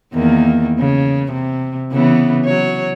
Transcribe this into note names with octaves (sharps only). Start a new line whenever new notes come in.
E2 D#3 A#3
C#3
C3
C#3 E3 B3
F#3 C#5